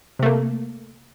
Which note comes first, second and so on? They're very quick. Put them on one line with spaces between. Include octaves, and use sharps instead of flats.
C3 A3 A#3